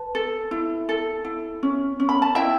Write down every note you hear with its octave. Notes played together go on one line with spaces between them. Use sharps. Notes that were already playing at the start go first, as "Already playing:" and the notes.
Already playing: B4 A5
A4
E4
A4
E4
C#4
C#4
B5
A5
E4 E5 G5